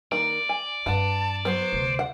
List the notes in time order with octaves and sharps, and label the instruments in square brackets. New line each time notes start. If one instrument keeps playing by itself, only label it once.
[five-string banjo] D#3 A#3 [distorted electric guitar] D5
[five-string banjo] G#5
[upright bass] G2 C4 [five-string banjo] B4 F#5 [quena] A5
[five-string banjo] F#3 B3 [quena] C5
[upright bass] D2 C3
[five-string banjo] F#5